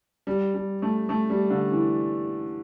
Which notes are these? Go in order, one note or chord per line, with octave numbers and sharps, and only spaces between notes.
G3
G3
A3
A3
G3
D3
E3